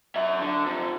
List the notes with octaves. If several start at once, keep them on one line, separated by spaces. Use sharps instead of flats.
F#3 E5
D3
C3 F3